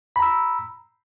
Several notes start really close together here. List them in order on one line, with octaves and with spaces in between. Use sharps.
B5 A#5 E6